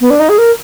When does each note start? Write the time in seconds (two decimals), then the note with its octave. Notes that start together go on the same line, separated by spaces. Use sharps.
0.01 B3
0.10 D4
0.20 D#4
0.29 G#4
0.38 A#4